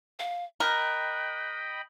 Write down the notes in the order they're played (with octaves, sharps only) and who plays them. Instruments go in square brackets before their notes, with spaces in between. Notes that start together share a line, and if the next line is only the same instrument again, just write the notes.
[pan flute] F5
[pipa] A#4 [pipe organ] D#5 G5 B5 [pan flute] F#6